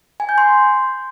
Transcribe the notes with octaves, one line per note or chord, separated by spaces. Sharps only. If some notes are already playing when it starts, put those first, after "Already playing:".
G#5
G6
C6